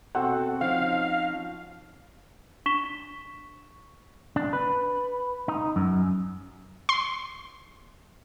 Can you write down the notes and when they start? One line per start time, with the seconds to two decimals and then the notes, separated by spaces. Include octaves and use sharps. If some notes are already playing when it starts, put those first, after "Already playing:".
0.15 B2 C4 F#4 A4 F#5
0.61 F3 C#4 D#4 F5
2.66 D4 C#6 B6 E7 G7
4.36 D4
4.53 B4
5.48 D#4
5.76 F#2
6.89 C6